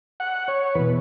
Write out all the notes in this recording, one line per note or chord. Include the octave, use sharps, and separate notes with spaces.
F#5
C#5
E2 B2 B4